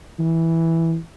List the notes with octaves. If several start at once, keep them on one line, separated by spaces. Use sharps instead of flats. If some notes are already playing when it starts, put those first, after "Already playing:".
E3